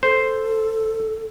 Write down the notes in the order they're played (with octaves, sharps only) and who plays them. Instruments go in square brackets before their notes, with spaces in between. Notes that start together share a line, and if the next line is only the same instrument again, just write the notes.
[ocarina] A4 [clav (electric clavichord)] C5